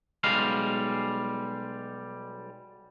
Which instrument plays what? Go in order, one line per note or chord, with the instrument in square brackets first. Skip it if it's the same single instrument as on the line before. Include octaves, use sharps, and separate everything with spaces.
[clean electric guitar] B1 G3 G#3 F5